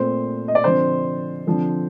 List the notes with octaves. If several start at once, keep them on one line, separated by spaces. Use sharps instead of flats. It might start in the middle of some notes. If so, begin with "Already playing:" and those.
Already playing: A#2 A3 C4 C5
D#5
D5
D3 F3 C4 C5
D3 F3 C4